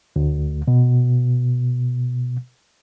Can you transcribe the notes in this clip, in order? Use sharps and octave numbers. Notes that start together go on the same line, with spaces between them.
D2
B2